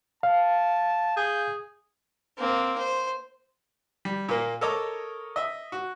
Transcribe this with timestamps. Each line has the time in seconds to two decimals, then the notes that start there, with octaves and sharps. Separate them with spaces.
0.23 F5 A5
1.17 G#4 G6
2.38 A#3 C4
2.78 C5
4.05 G3
4.29 A#2 A#3
4.61 A4 A#4 C#5 D#5 A#5 D6
5.36 D#5 E5
5.72 F#4